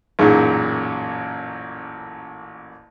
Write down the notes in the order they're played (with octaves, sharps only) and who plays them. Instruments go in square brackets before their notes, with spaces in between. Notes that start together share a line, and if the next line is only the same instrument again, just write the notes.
[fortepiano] A1 F#2 A#2 [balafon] D#4 G#4